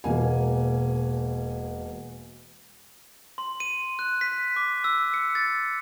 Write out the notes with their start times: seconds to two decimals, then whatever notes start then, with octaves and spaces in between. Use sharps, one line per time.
0.04 E1 B2 A#3 G#5
3.38 C6
3.60 D#7
3.99 F#6
4.21 B6
4.56 D6
4.84 E6
5.14 C#7
5.35 A6